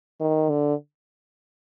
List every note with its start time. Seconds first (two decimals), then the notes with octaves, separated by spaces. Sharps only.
0.20 D#3
0.49 D3